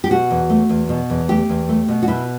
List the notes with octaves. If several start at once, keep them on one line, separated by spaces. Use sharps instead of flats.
G4
B2 F#4
E2
A3
E2
B2
E2
A3 G4
E2
A3
B2
F#4
B2 E4